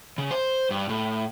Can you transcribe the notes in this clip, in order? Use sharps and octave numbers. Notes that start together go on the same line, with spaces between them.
C#3
C5
G2
A2